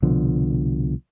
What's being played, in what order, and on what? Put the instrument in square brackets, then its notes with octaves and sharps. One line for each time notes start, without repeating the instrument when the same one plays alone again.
[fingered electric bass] C2 B2 D3 F3